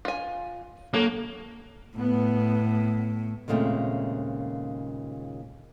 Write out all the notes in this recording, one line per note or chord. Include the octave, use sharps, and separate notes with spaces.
F4 G#5
F#3 A#3 A4
A2 B3
D#2 A#2 C#3 G#3 A3 C4